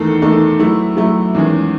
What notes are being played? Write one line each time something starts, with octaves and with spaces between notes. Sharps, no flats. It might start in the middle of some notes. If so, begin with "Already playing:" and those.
Already playing: E2 D#3 A3 D#4 A4
E2 D#3 A3 D#4 A4
F#3 A3 E4
F#3 A3 E4
E2 D#3 G#3 C#4 G#4